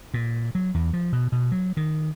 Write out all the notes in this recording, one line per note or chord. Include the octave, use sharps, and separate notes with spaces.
A#2
F#3
E2
F3
B2
B2
F#3
D#3